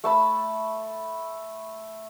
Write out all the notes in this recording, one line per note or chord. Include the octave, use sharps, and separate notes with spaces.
A3 A5 B5